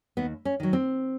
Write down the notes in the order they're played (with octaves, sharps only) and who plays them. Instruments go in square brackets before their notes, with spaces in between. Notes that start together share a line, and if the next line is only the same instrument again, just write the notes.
[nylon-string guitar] D#2 B3
C#4
D#3 F#3
C4